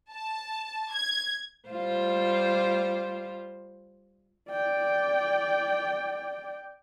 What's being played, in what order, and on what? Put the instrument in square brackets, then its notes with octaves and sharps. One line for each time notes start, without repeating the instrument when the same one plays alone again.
[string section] A5
G#6
[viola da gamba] G3 F4 C5
[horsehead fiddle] D5 G5